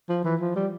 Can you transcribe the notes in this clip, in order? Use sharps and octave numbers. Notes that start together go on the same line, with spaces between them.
F3
E3
F3
G3